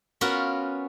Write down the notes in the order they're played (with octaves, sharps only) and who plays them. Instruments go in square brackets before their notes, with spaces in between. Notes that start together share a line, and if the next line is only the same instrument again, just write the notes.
[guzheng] B3 C#4 F4 F#4 A#4 B4